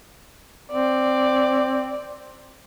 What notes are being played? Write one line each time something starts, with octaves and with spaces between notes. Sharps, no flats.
C4 D5